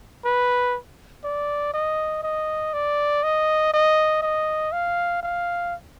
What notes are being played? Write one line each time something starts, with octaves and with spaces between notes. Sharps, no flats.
B4
D5
D#5
D#5
D5
D#5
D#5
D#5
F5
F5